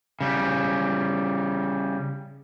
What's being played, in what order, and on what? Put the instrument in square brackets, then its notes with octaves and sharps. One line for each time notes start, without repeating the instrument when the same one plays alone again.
[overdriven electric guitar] C#3 G3